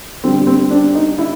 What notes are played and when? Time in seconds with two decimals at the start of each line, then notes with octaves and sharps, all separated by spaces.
0.24 D3 G3 C4
0.47 C4
0.71 D4
0.95 D#4
1.18 E4